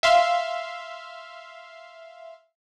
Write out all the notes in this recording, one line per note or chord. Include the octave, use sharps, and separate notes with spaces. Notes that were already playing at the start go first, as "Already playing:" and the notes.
E5 F5 C6